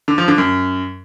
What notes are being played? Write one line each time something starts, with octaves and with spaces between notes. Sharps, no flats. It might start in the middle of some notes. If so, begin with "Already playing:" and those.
D3
F3
D3
F#2